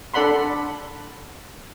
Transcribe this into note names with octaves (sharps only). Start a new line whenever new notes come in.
D4 A4 D5 F#5 B5 C6